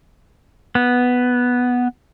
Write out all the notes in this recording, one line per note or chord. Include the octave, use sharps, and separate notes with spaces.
B3